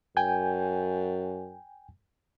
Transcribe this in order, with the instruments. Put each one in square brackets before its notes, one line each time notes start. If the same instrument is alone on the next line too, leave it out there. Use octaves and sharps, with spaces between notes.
[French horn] F#2 [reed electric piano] G5 G#5 G6